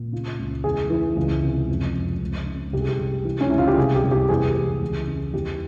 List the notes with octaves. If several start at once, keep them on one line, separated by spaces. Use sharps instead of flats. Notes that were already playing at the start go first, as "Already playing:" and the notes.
Already playing: A#2
C#3 F4
C#2
E2 G#4
E3
C#2
C3
F2
F2
C#2
C#3
C2 G4
G#4
G4
C2
E3
C#4
C#2 E4
F4
G4
C2 G#4
G4
C2
G4
E2 G#4
E2
C#2
C#3
E2 G4